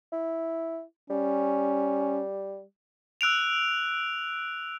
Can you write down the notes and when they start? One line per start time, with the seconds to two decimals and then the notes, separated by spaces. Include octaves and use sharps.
0.13 E4
1.10 G3 C#4
3.21 E6 F#6 D7 F7